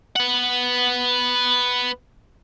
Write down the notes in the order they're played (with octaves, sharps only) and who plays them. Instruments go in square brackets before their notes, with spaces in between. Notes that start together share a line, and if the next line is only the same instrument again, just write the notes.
[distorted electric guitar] B3 F#5